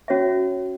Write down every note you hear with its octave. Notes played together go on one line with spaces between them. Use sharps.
C#4 F#4 C#5 E5